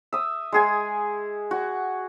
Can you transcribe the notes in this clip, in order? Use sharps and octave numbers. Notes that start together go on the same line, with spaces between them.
E5 D#6
G#3 G#4 G#5
F#4